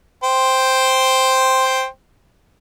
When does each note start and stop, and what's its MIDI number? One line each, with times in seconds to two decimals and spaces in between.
0.23 1.86 72
0.23 1.86 79